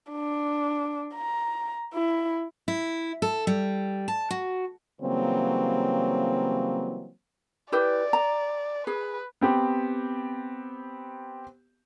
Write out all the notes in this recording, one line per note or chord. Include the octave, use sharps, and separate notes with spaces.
D4
A#5
E4
E4
A4
G3
A5
F#4
C#3 E3 F#3 G3 A#3 C4
E4 G4 B4 D5
A#5
G#4 B4
B3 C4 G4